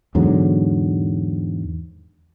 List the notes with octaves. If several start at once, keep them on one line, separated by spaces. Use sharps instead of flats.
E2 G#2 D3 F#3